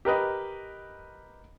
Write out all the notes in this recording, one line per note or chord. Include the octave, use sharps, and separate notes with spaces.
G4 A#4 B4 D#5